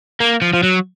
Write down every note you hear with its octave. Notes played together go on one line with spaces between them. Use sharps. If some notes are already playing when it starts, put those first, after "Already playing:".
A#3
F3
F3
F#3